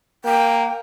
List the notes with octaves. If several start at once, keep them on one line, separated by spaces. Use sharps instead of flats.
A#3 G5